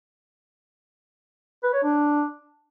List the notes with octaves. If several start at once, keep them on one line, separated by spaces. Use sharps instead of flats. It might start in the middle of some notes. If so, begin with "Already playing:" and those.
B4
C#5
D4